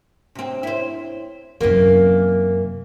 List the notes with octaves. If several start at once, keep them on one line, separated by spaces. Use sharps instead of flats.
C3 C4
E4 C5
F#2 C3 E3 A#3